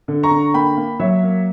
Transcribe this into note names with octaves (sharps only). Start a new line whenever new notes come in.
D3
A#5 C#6
D3
A#3 G5 B5
A#3
F#3 C#5 E5
A#3